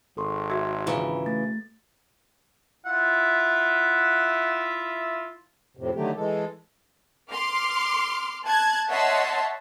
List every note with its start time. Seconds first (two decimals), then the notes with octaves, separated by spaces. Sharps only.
0.17 G#1 A4 C6 C#6
0.50 F#4 G#4 E5 C6 E6 G#6
0.87 C#3 E3 F4 A#5 E6
1.26 A3 A6
2.86 E4 F4 E5 F#5
5.77 F2 A2 C3
5.95 D3 D#3 F#3 A3 G4
6.17 E3 G#3 A4
7.30 C6 D6 F6
8.45 A5 F#6 G#6
8.90 C#5 D#5 E5 F#5 A5 C6